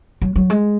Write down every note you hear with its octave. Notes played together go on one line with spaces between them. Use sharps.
F#3
F#3
G#3